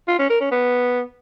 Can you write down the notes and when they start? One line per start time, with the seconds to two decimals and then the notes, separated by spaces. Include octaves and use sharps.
0.08 F4
0.19 C#4
0.30 A#4
0.41 C#4
0.52 B3